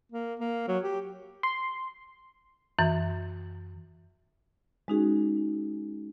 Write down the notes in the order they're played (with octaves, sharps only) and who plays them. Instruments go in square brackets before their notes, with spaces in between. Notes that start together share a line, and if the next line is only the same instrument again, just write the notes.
[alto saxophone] A#3
A#3
F#3
G4
[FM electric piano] C6
[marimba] F#2 E3
G#3 C#4 D#4 F#4 G#4